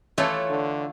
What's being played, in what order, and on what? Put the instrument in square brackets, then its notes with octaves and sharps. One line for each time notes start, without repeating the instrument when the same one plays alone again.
[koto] E3 A3 F4 [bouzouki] A4 C#5 E5
[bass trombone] D3